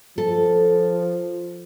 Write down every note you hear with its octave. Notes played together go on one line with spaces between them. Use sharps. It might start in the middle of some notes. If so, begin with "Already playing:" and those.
F3 A4